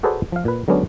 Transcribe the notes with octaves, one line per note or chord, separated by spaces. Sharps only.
F#4 G#4 A4 B4 C5 D5
F3 F5
A#2 B4
D3 F#3 G#3 B3 C#4 D4